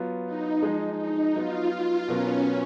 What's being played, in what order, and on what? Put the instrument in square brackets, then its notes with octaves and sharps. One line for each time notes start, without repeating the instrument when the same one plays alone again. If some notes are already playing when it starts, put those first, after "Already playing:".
Already playing: [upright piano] F#3 B3 F4
[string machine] D#4
[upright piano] F3 G#3 D#4 G#4 D#5
[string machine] D#4
[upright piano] F#3 B3 D#4 F#4 [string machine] F4
[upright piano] B2 F#3 B3 F#4 A#4 [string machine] C#4